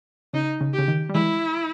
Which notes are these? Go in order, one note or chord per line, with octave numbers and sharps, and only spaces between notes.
C#3 D#4
C#3
C#3 G4
D#3
G3
E3 G#3 E4